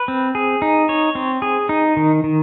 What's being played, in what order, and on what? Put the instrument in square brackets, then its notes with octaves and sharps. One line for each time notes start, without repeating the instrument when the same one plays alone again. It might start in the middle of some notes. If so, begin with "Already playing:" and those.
Already playing: [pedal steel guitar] B4
C4
G#4
D#4
C#5
C4
G#4
D#4
D#3
D#3